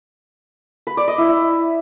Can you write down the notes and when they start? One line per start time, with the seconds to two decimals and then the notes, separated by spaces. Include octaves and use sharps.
0.87 B4
0.97 D5
1.08 D#5
1.18 E4
1.29 E4